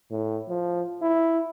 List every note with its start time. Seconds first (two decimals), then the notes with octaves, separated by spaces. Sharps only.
0.10 A2
0.49 F3
1.02 E4